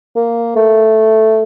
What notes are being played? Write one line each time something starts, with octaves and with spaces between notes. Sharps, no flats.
A#3
A3